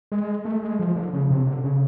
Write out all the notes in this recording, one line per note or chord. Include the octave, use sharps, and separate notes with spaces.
G#3
A3
G#3
F3
D3
C#3
C3
D3
C#3